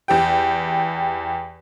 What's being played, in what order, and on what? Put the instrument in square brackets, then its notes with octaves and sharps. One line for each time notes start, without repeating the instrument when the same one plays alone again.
[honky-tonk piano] E2 G4 G5